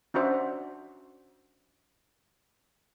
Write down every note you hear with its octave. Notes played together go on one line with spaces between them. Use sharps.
C#4 D4 F#4 C5 E5